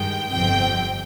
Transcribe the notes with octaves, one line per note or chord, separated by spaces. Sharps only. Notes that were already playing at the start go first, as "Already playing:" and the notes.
Already playing: G2 D#3 G#3 G5
G1 F2 C3 F3 C4 G5